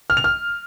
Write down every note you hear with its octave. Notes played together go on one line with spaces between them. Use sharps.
F6
F7
F6